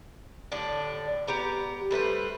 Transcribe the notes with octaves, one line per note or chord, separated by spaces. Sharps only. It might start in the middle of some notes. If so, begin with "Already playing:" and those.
A2 D3 D4 G4
B3 G4 F#5 A#5
G3 A3 B4 C5